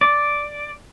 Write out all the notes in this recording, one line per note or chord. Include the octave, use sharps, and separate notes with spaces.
D5